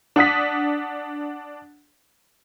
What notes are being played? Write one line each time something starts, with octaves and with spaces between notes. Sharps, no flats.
D4 F#5 D#6 B6